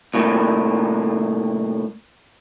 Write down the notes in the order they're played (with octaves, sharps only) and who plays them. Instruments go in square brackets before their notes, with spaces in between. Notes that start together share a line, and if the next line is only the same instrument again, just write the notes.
[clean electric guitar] C2 A2 A#3